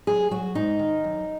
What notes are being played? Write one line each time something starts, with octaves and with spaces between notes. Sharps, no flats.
F#3 G#4
F#3 F#4
G#2 D#4
D#3
F#2